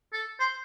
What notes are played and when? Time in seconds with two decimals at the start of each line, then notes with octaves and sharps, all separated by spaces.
0.13 A4
0.40 C5